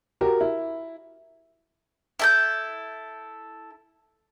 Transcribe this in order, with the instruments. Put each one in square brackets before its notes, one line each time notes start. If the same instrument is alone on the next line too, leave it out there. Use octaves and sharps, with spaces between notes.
[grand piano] F#4 G4 A#4
E4
[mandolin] E4 A4 G6